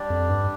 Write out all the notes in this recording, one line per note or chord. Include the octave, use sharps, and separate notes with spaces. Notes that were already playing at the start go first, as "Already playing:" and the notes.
Already playing: G3 D4 G4 D5
F2
G2